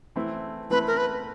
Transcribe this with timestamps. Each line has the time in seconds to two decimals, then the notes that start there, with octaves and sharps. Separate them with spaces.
0.16 E3 A3 C4 E4
0.70 E3 A3 C4 E4 B4
0.87 A#4
0.97 B4